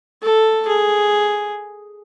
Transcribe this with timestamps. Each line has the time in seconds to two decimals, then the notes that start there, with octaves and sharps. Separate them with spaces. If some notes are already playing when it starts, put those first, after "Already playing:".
0.23 A4
0.67 G#4